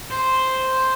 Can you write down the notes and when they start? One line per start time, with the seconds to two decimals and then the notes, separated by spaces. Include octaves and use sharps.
0.11 C5